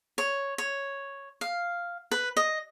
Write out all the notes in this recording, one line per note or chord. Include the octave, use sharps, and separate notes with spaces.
C#5
C#5
F5
B4
D#5